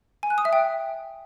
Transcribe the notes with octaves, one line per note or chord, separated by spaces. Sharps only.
G#5
F#6
D#6
E5
G5